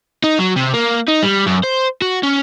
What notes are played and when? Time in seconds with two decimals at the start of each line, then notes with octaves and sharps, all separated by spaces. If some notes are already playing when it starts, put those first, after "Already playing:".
0.24 D#4
0.39 F#3
0.56 C3
0.74 A#3
1.08 D#4
1.23 G3
1.47 F#2
1.64 C5
2.02 F#4
2.23 C#4